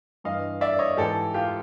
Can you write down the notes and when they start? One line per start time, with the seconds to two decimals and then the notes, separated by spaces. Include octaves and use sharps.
0.24 G2 E3 D#5 F5
0.61 D5 E5
0.79 C#5 D#5
0.97 G#2 E3 G4 A4
1.34 F4 G4